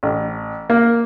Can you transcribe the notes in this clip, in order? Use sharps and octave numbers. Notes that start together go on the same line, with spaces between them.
A1
A#3